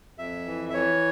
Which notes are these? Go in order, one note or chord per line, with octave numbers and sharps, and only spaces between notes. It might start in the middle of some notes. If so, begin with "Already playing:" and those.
F2 E5
E3
E5
E3 C#5